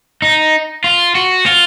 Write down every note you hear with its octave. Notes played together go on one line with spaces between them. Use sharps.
D#4
F4
F#4
F4